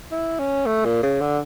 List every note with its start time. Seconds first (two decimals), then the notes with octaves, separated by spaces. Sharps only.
0.11 E4
0.39 C#4
0.66 A3
0.85 A#2
1.03 C#3
1.21 D3